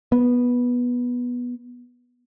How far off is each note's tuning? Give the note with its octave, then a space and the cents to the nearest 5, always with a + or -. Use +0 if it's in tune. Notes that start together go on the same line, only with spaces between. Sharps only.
B3 -10